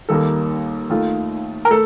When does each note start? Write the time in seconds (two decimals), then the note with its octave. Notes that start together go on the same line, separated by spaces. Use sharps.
0.09 D#2 D#3 G3 A#3 A4
0.89 D#2 D#3 A3 F4
1.65 A#4
1.71 A3 A4